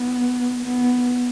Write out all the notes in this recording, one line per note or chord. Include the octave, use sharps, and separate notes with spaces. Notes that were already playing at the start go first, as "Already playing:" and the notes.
Already playing: B3
B3